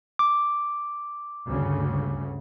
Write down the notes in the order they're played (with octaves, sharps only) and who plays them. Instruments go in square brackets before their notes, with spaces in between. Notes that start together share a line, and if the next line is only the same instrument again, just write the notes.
[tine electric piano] D6
[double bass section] D2 G2 C#3